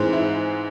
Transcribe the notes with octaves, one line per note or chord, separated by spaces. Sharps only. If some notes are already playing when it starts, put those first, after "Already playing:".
Already playing: G#2 E3 G#3 C4
E4